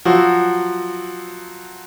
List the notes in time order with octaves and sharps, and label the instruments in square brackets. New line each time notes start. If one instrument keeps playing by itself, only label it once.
[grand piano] F3 F#3 F#4